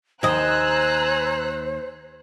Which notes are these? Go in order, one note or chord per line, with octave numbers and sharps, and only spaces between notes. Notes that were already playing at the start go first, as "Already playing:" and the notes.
D#2 C5 D#5 G#5 A#5 E6 F#6